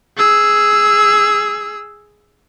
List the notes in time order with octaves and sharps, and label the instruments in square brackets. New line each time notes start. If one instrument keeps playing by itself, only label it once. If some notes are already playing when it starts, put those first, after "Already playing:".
[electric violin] G#4 E6